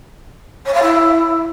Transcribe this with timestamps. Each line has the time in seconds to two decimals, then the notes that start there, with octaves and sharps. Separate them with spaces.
0.65 C#5
0.74 F5
0.82 E4